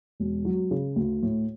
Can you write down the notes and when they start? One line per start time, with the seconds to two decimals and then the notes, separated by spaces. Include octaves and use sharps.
0.20 E1
0.45 F#3
0.71 C#3
0.96 D2
1.23 A2